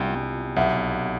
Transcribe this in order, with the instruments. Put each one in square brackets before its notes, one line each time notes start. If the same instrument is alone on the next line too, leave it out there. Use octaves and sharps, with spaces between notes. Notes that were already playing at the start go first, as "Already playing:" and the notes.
Already playing: [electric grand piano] C2 [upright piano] G5
[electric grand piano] C2
[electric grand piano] B1 [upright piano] E5 F#5